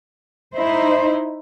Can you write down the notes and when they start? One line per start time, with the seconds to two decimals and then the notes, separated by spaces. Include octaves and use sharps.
0.54 D#4 E4 C5